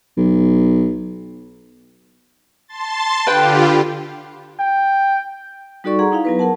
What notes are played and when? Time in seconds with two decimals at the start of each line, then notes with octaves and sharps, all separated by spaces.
0.17 B1
2.68 A5 C6 A6
3.27 D3 F4 G4 B4 G5
4.60 G5
5.84 G3 D#4 F#4 A4 D5 C#6
5.99 G#4 F#5 A#5 C6
6.12 D#4 E4 F5
6.25 F#3 B3 B4
6.39 A#4 F#5 A5